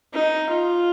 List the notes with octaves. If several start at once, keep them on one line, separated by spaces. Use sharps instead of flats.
D#4
F4